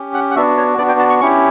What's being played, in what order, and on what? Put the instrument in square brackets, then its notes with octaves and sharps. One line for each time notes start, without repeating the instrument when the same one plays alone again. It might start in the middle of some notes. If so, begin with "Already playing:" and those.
Already playing: [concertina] C#4 G4
F#5
F#5
B3 D4 F#4 E5
C#5
B3 D4 F#4 D5
G5
A5
C#6
C#4 E4 G4 C#6